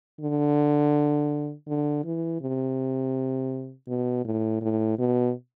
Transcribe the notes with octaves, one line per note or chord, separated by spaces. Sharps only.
D3
D3
E3
C3
B2
A2
A2
B2